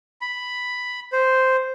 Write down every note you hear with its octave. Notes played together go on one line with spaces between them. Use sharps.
B5
C5